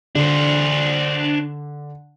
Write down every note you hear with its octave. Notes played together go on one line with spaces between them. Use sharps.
D3 D4 C5